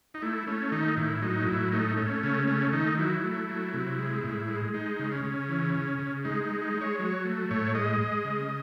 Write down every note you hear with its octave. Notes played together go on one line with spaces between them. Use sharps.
D#4
A3 E4
A3 C#4
D#3 D#4
A2 E4
F#3 D#4
A2 E4
A3 D#4
A3 C#4
C#3 C#4
A3 C#4
D#3 D#4
F#3 E4
A3
F#3
C3
G#3
A2
G#3
G#3 D#4
C#3
C#4
C#3
E3
C#3
C#3
G#3 D#4
D#4
G#3
D#4
G#3
C#5
F#3 C#5
A3
A2 C#5
G#3 D#5
G#3
C#3